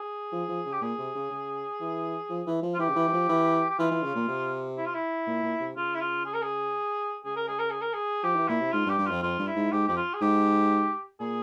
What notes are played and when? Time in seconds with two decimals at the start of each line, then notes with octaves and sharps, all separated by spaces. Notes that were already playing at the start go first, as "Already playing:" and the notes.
Already playing: G#4
0.32 F3
0.49 F3
0.66 C#3
0.72 G4
0.82 A#2 G#4
0.98 C3
1.15 C#3
1.31 C#3
1.80 E3
2.30 F3
2.46 E3
2.62 F3
2.74 F4
2.79 E3 G4
2.89 C#3
2.96 E3
3.08 E3
3.13 F3
3.29 E3
3.69 G4
3.78 E3 F4
3.91 E3
4.03 C#3
4.15 A#2
4.28 C3
4.77 E4
4.86 F4
4.94 E4
5.27 A#2
5.43 A#2
5.60 C3
5.77 C#3 F4
5.95 E4
6.01 F4
6.26 G#4
6.34 A#4
6.42 G#4
7.25 C#3 G#4
7.36 A#4
7.48 G#4
7.59 A#4
7.70 G#4
7.81 A#4
7.93 G#4
8.23 F3 G4
8.35 E3
8.48 A#2 E4
8.60 C3
8.73 G#2 F4
8.86 G2
8.89 G4
8.98 G2
9.06 F2 F4
9.22 F2 F4
9.39 G2
9.47 E4
9.55 G#2
9.72 G#2 G4
9.87 F2 G4
9.97 F4
10.14 G#4
10.21 G#2 G4
11.20 A#2 G#4